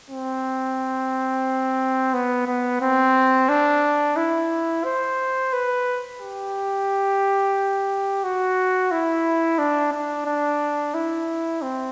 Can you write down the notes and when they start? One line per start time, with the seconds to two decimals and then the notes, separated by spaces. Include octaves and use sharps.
0.10 C4
2.14 B3
2.47 B3
2.81 C4
3.49 D4
4.16 E4
4.84 C5
5.53 B4
6.20 G4
8.23 F#4
8.91 E4
9.58 D4
9.93 D4
10.26 D4
10.94 E4
11.62 C4